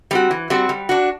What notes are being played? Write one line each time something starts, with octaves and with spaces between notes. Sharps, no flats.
G3 C4 F#4
E3
G3 C4 F#4
G3
D4 F#4